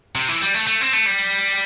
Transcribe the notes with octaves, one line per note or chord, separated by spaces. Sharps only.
C3
E3
G3
A3
A3
C4
A3
G3